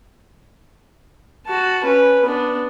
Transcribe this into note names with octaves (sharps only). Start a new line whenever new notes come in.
F#4 A5
C#4 B4
B3 D4